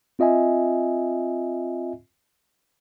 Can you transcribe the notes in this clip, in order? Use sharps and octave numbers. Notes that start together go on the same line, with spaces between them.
C4 F4 D#5 E5 G#5